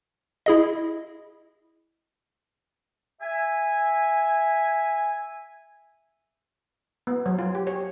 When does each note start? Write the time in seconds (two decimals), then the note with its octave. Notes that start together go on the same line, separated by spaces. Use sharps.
0.46 E4 G#4 D#5
3.21 E5 G#5
7.07 B3
7.26 F#3
7.39 F4
7.55 G4
7.67 C#5